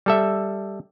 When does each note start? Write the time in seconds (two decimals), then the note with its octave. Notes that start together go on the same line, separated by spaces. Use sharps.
0.06 G3 A4 E5